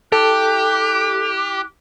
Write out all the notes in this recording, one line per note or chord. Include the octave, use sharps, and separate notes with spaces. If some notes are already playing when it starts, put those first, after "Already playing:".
E4 G4 A4 D6 F#6